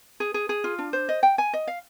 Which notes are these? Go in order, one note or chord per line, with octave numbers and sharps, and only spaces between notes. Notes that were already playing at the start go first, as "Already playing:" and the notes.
G#4
G#4
G#4
F4
D4
C5
D#5
G5
G#5
D#5
F5